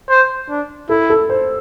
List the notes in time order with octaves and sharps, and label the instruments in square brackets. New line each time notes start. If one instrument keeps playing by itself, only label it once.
[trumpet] C5
D4
[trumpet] E4 [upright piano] A4
[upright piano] A4
C5